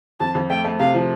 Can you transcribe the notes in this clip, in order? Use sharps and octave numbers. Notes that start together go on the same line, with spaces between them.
F2 A5
F2
A3 G5
A3
C3 F5
F3